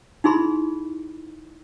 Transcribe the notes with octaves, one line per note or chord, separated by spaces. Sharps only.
D#4 E4 G#4 B5 C6